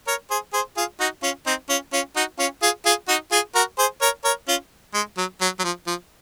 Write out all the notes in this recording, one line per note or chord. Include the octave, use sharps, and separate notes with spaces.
A#4 C#5
G#4 C5
G#4 C5
F4 G#4
D#4 F#4
C#4 F4
C4 D#4
C#4 F4
C#4 F4
D#4 F#4
C#4 F4
F4 G#4
F4 G#4
D#4 F#4
F4 G#4
F#4 A#4
G#4 C5
A#4 C#5
A#4 C#5
C#4 F4
G#3
F#3
F#3
F#3
F3
F3